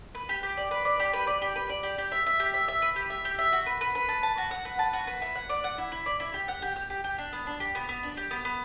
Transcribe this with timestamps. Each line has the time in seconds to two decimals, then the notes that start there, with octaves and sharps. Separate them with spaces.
0.15 B4
0.29 G4
0.43 G4
0.57 D5
0.71 B4
0.85 D5
1.00 G4
1.13 B4
1.27 D5
1.42 G4
1.56 B4
1.69 D5
1.83 G4
1.98 G4
2.12 E5
2.26 E5
2.40 G4
2.54 E5
2.68 E5
2.82 B4
2.96 G4
3.10 E5
3.25 G4
3.39 E5
3.52 F#4
3.66 B4
3.81 B4
3.95 B4
4.09 A5
4.23 A5
4.38 F#4
4.51 F#5
4.65 B4
4.79 A5
4.93 F#4
5.07 B4
5.22 E4
5.35 F#5
5.49 D5
5.64 F#5
5.78 E4
5.92 E4
6.06 D5
6.20 E4
6.34 G4
6.48 F#5
6.62 G4
6.76 G4
6.90 G4
7.04 G4
7.18 D4
7.33 B3
7.47 D4
7.60 G4
7.75 B3
7.89 B3
8.03 D4
8.17 G4
8.31 B3
8.45 B3